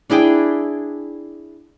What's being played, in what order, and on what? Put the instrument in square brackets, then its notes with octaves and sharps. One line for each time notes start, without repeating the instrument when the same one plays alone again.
[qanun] D4 E4 G#4 G5